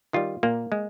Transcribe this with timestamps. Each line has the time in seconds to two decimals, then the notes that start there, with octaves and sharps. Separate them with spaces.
0.13 D#3 G3 F4
0.43 A#2 A#3
0.72 G#3